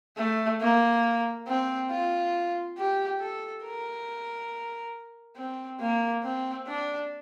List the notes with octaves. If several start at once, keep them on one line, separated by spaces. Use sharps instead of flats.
A3
A#3
C4
F4
G4
A4
A#4
C4
A#3
C4
D4